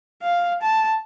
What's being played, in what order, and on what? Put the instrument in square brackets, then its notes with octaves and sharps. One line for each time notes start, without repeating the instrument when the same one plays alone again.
[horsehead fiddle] F5
A5